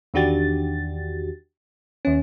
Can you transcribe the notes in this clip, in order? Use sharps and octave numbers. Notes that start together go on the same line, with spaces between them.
E2 D#3 D4 F#4 G4 A6
D#2 C#4